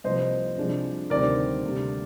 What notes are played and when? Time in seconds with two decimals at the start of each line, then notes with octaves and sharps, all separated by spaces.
0.04 C2 C3 F3 A#3 C5 D#5
0.57 C2 C3 F3 G#3 D4
1.10 D2 C3 D#3 G3 C4 A#4 D5
1.64 D2 C3 G3 A#3